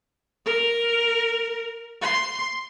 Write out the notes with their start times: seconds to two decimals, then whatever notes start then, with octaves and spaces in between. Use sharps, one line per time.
0.46 A#4
2.02 C6